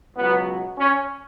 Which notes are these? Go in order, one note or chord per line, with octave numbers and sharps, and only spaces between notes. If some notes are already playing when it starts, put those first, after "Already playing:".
C#2 B2 F#3 B3
C#4